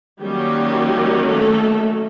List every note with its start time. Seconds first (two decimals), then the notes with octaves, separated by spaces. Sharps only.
0.21 D#3 F#3 G3 A#3 C#4 G4
1.28 A3 A4